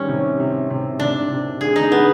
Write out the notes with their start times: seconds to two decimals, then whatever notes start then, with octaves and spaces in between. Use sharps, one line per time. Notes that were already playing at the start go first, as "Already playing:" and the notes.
Already playing: D#3 G3 C#4
0.08 C3
0.40 C3
0.70 C3
1.00 C3 D4
1.30 C3
1.61 D3 G#4
1.76 D#4
1.91 D3 B3